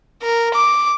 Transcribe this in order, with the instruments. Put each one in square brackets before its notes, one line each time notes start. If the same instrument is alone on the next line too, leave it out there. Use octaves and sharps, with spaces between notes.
[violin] A#4
D6